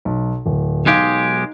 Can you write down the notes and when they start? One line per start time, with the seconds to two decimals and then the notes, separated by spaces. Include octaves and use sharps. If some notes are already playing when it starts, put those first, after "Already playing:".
0.05 B1
0.46 D1
0.86 B1 G#3 D#4 G4 F5